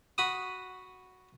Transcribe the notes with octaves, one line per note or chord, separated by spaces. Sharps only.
F#4 B5 D#6